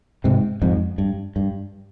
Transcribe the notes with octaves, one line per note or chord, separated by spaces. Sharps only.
G#2 C3
F2 G#2
G2
G2